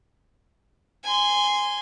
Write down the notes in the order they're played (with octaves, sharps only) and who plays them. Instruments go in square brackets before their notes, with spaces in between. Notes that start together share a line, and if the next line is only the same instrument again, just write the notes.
[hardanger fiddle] G#5 C6